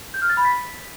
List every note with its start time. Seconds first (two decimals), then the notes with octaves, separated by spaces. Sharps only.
0.14 G6
0.22 F6
0.29 A6
0.37 B5
0.45 B6